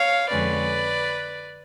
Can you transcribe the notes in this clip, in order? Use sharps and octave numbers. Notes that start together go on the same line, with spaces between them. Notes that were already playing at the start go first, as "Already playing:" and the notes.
Already playing: C#5 F5
F2 D3 G#3 C#4 B4 D5